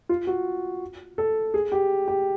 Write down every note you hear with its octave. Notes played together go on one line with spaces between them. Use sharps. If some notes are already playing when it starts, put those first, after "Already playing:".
F4
F#4
A4
G#4
G4
G4